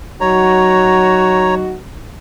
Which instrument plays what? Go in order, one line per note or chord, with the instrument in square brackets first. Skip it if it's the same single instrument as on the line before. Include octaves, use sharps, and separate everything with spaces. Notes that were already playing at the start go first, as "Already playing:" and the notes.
[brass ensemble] F#3 D#4 F#4 [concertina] C#5 A#5